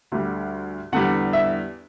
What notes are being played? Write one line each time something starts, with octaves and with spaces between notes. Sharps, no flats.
D2 D3 G3
E2 D3 G3 F#5
E5